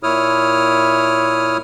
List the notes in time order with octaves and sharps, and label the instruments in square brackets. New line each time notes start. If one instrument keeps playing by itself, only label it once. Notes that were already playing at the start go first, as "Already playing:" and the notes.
[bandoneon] A#2 E4 C#5 D#6 F6